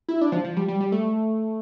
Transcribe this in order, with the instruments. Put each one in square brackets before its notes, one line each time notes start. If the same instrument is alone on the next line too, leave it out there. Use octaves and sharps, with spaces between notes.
[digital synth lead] E4
D4
F3
F3
G3
G3
G3
A3